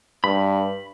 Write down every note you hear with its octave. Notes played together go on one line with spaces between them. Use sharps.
G2 B5